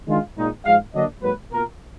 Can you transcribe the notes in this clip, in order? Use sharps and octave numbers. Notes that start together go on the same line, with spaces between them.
D#3 G#3 D4 F4
A#2 G#3 D#4
G#2 F3 G#3 F5
D3 F#3 A#3 D4 D#5
G#2 F#3 A#3 B4
B2 A#3 F4 A#4